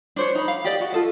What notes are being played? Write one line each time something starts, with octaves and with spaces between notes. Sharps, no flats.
D4 C5 C#5
D#4 B5
F5
G4 D5 D#5
F#4
F4 A4 D#5